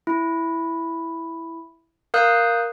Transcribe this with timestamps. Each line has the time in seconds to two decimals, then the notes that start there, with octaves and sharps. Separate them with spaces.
0.07 E4
2.14 A#4 F5 D#6 F#6 G6